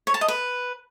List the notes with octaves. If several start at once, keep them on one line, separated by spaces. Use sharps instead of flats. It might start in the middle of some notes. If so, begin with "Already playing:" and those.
C#5
A5
D#5
B4